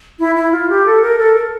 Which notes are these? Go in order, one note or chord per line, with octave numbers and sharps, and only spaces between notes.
E4
E4
F4
G4
A4
A#4
A4
A#4